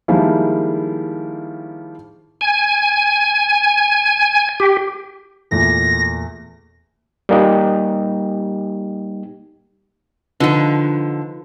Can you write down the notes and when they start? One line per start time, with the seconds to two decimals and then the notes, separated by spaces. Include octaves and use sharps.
0.08 D#3 F3 G3 G#3 A#3 E4
2.41 G#5
4.60 G4
5.51 E2 A#2 A3 A#6
7.29 G3 A#3 D#4 G4
10.40 D3 F3 D#4 F4 B4